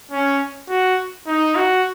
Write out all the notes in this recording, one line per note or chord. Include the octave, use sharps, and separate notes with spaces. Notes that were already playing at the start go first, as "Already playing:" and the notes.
C#4
F#4
D#4
F#4